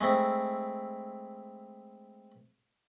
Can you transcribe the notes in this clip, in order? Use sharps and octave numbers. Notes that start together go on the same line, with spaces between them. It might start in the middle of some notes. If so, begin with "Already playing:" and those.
G#3 A3 C4 E4